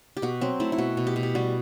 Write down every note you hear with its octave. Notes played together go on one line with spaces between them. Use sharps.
G4
B2 F#4
F#3 C4
A3 E4
E4
B2 F#4
B2
G4
B2
G4
G3 F#4